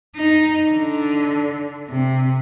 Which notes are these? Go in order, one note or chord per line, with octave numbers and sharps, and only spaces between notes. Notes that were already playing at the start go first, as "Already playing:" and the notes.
D#4
D3
C3